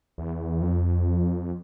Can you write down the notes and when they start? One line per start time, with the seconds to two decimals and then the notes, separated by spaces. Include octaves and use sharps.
0.18 E2
0.62 F2